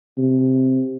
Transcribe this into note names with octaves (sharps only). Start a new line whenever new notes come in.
C3